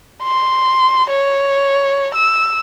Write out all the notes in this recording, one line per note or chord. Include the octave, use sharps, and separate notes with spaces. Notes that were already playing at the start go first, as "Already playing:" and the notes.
C6
C#5
E6